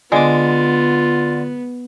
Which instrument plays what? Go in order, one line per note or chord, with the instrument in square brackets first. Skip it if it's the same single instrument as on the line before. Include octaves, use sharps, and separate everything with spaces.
[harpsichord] D3 D6 [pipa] G#3 [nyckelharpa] B3 [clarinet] F4